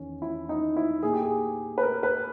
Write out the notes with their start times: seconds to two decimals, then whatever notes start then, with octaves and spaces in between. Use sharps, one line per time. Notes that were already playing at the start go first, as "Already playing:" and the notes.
Already playing: E2 D#3 C#4
0.22 E4
0.49 D#4
0.77 E4
1.03 A#2 G#4
1.13 G4
1.22 G#4
1.78 B4
1.83 A#4
2.03 B4